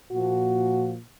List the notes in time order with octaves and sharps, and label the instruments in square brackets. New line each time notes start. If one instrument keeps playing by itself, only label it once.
[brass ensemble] A#2 F3 F#4